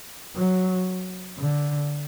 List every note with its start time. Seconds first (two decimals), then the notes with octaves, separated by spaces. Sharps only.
0.36 F#3
1.38 D3